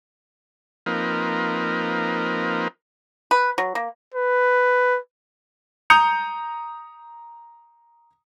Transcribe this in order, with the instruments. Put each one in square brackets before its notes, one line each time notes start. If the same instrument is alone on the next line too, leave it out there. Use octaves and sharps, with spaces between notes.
[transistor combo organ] F3 A#3 C4 D#4 A#4 B4
[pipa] B4
F#3
A#3
[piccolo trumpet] B4
[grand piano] A#5 D#6 G6 C#7 F7